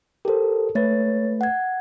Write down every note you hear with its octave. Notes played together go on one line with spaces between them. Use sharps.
G4 A4 A#4 C5
A3 B4 C#5 A6
F#5 G#6